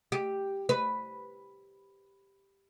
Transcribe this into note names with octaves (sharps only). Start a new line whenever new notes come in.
G4
B4